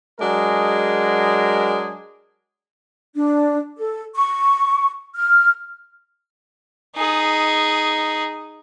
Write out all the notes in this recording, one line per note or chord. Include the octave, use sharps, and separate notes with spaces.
F#3 G#3 D4 G#4 A#4
D4
A4
C#6
F6
D#4 G#4